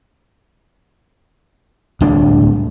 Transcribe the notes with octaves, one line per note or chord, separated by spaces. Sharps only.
D1 C2 A2 D4